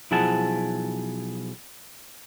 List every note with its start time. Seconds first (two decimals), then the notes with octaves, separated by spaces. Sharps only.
0.11 B1 F3 E4 G#4 F#5 A5